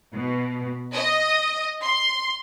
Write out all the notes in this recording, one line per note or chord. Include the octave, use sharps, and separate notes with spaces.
B2
D#5
C6